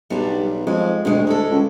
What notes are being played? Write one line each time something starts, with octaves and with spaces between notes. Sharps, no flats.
B1 G3 B3 D4
F2 G#3
D2 G2 B2 G#3
G#3 E4 A4
C#2